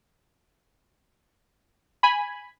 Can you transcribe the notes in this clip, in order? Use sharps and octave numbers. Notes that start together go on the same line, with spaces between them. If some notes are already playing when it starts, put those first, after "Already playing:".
G#5 B5